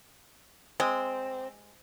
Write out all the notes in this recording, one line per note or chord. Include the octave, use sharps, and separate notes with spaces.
G#3 C4